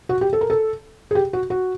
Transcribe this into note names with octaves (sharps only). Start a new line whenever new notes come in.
F#4
G4
A4
A#4
A4
G#4
G4
F#4
F#4